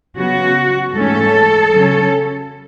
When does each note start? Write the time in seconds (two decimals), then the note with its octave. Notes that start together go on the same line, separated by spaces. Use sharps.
0.16 C#3 F#3 B3 F#4
0.95 G#2 E3 A3 C#4 A4
1.74 C#3 F#3 C#4